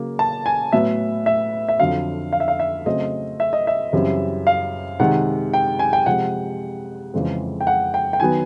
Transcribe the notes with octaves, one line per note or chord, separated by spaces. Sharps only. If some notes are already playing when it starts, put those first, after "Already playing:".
Already playing: C#3 F#3 A#3
A5
G#5
A2 F#3 B3 E5
E5
E5
F2 D3 F#3 F5
F5
E5
F5
E5
C#3 F#3 A3 C4 D#5
E5
D#5
E5
F#2 C#3 E3 G3 C4
F5
C3 D#3 G#3 F#5
G5
G#5
G5
C3 F3 G#3 F#5
F2 C#3 E3 G#3 C4
G5
F#5
G5
G5
D#3 F#3 B3 G#5